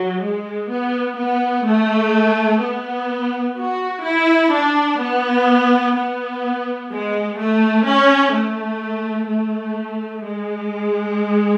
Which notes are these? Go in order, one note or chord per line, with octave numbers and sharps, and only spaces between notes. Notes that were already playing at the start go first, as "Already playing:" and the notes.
Already playing: F#3
G#3
B3
B3
A3
B3
F#4
E4
D4
B3
B3
G#3
A3
C#4
A3
A3
G#3